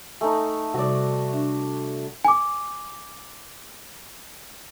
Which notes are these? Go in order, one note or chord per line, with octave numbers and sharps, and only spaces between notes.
A3 D#4 G#5 A#5
C3 G3 F#4 D5
D4 E5
G#5 D6